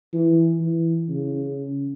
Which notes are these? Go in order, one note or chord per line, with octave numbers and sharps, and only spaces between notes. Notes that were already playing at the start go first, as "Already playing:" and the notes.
E3
E3
C#3